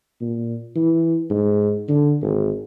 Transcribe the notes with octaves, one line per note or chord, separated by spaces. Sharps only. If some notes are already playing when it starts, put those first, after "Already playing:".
A#2
E3
G#2
D3
G#1